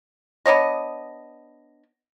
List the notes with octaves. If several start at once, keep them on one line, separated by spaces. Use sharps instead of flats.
B3 D4 C#5 D#5